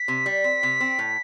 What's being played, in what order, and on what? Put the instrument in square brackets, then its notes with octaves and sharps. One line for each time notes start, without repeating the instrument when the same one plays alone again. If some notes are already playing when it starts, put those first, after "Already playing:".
Already playing: [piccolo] B6
[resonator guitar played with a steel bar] C3
G3
C4
C3
C4
A2